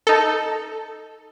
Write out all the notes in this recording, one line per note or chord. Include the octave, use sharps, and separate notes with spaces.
D#4 A4